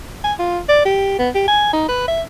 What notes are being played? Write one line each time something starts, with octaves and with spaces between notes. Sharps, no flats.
G#5
F4
D5
G4
B3
G4
G#5
D#4
B4
E5